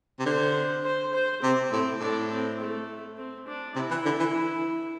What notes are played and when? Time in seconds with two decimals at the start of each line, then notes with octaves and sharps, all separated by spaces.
0.19 C3
0.26 D3 C5
0.84 C5
1.13 C5
1.42 C3 C4
1.72 A2 C4
2.00 A2 D4
2.30 C4
2.59 A3
3.18 C4
3.47 D4
3.75 C3 E4
3.91 E3
4.05 D3
4.20 E3